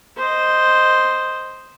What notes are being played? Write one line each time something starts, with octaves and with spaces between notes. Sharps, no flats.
C5 D#5